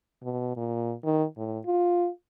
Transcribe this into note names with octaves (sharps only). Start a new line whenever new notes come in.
B2
A#2
D#3
A2
F4